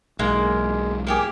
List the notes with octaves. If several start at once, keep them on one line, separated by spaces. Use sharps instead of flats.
B1 G#2 G#3 A#3
A#3 G4 G#4